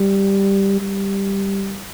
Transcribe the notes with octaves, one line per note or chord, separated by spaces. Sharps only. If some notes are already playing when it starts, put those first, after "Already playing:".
Already playing: G3
G3